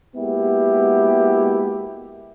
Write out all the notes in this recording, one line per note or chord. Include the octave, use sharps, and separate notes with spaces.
G#3 A#3 B3 E4 F#4 G4